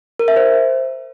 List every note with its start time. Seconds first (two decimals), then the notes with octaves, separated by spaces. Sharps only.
0.19 A#4
0.28 E5
0.36 C5